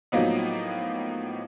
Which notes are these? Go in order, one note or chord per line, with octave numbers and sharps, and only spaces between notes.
A2 F3 F#3 A#3 B3 D#4